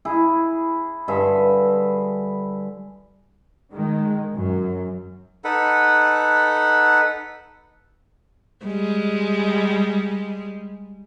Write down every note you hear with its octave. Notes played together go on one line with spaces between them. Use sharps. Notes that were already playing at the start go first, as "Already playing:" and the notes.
E4 G#4
G2 D3 G#4 E5
D#3 G#3
F#2
D#4 A4 B4 F#5
G3 G#3